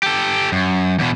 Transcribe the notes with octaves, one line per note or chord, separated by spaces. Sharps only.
G4 A4
F#2
E2 B2